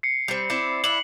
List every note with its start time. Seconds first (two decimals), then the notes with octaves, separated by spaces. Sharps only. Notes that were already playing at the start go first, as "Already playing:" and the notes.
0.03 C7 C#7
0.28 G3 C4
0.50 C4 E4 D5
0.84 D4 E4 F#7